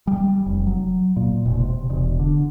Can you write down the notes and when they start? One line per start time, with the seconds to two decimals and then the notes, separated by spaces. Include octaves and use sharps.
0.07 G3
0.46 F1
0.67 F#3
1.17 A#2
1.46 E1
1.60 C3
1.90 E1
2.19 D3